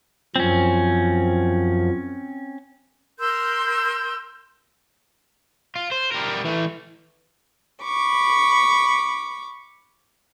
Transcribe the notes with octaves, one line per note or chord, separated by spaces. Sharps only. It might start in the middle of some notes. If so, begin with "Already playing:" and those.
F#2 F3 C4 C#4
A#4 C6 E6 G6
F4
C5
G3 A#4
E3 A3
B5 C#6 D6